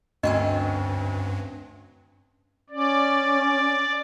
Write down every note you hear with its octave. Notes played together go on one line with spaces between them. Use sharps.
D2 G2 C4 C#4 C#5 D#5
C#4 D5